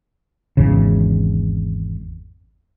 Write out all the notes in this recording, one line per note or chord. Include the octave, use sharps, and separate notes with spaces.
G#1 E2 C#3